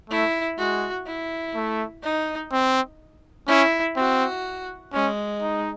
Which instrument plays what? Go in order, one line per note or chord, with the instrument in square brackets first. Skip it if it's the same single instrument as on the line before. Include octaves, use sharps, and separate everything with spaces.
[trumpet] A3 [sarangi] E4
[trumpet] G#3 [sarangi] F#4
[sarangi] E4
[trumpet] A3
[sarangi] D#4
[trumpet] C4
[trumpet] C#4 [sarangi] E4
[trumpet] C4 [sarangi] F#4
[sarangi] G#3 [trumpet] C#4
[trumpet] D#4